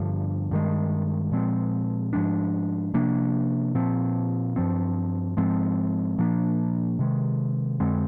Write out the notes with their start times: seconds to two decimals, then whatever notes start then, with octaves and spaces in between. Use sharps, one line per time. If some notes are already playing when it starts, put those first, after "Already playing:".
Already playing: G2 D3 F3
0.51 G2 D#3 G#3
1.32 A#2 F3 G#3 C4
2.13 G#2 F3 G#3 D4
2.94 C3 F3 A#3 D4
3.75 A#2 F3 C4
4.56 G2 F3 C4
5.37 G#2 F3 G#3 C4
6.18 A#2 F3 A#3 D4
6.99 C3 D#3 G#3
7.80 F2 D3 G#3 C4